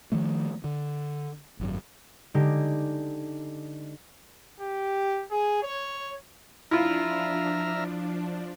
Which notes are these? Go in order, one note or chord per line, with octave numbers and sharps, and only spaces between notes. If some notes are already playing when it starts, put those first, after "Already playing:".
D#3 F3 A3
D3
G#1 F#2
D3 G#3 D#4 G4
G4
G#4
C#5
F3 D4 E4 F4 E5 A#5 F6